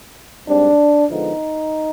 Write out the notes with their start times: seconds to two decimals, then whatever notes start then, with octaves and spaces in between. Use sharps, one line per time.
0.48 G#2 G3 C4 D4
1.11 D3 F3 G#3 B3 D#4